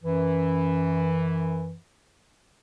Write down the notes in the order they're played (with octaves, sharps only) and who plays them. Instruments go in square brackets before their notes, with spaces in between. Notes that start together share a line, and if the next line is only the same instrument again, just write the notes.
[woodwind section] F#2 E3